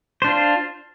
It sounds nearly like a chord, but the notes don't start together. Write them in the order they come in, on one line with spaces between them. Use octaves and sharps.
C5 D4 F4